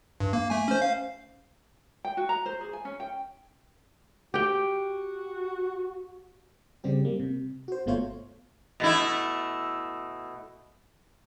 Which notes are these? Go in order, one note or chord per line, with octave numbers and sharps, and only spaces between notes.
G2
A#3
A3 G#5
C#4 C5
F5
G5
F#4
A#5
C5
G#4
G#5
C#4
G5
F#4 G4 G5
C#3 G3 C4 G4
G3 A#3
C3
F#4 C5
G1 B2 A3 F4 C5 C#5
B2 A3 E4